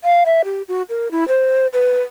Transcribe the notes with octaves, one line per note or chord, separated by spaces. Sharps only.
F5
E5
G4
F#4
A#4
E4
C5
B4